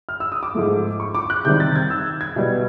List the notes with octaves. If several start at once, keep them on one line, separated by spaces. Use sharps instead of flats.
F6
E6
D#6
D6
G#2 F3 A3
C#6
D6
F#6
C3 D#3 G3 G6
A6
G#6
E6
G#6
B2 G3 B3